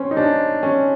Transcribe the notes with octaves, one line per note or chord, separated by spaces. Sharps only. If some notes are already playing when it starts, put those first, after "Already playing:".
Already playing: C4 C#4
D#4
D4
C#4